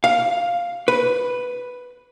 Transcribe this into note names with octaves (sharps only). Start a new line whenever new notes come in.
F5
B4